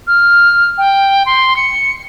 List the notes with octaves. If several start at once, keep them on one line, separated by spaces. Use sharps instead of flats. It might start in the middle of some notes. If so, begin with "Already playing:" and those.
F6
G5
C6
C#7